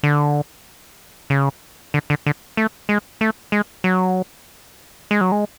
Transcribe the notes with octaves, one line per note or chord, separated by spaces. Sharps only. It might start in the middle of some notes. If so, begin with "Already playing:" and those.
D3
C#3
D3
D3
D3
A3
G#3
A3
G#3
F#3
G#3
F#3
G#3